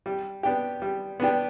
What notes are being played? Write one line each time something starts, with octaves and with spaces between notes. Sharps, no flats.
G3
B3 D4 G4
G3
B3 D4 G4